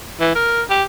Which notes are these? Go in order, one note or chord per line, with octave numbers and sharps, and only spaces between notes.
E3
A#4
G4